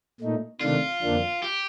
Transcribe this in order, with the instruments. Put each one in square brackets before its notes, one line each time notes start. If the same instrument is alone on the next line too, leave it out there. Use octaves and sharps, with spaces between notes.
[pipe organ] A#2 A3 D#4
[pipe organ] C3 D#3 A3 D4 [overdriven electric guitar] F4
[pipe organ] F2 D3 F3 A#3 D4
[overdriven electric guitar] G4